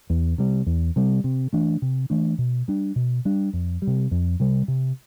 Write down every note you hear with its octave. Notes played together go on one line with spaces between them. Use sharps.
E2
C3 G3
E2
C3 G3
C3
E3 A3 D4
C3
E3 A3 D4
B2
G3 D4
B2
G3 D4
F2
G3
C3
F2
C3 G3
C3